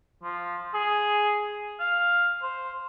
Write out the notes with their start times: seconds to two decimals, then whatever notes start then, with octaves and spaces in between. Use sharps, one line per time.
0.23 F3
0.74 G#4
1.80 F5
2.43 C5